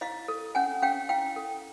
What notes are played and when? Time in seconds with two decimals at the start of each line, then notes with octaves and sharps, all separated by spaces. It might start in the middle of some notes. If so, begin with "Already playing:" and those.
0.01 E4 D#5 F5
0.28 A4
0.55 C#4 F#5 G#5
0.82 C#4 F5 G5
1.09 E4 F5 G5
1.36 A4